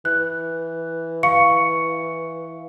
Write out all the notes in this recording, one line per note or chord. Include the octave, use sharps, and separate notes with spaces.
E3 F#6
F5 C#6 C#7